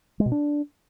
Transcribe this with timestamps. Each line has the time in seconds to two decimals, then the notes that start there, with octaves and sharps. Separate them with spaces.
0.20 G#3
0.26 B2
0.32 D4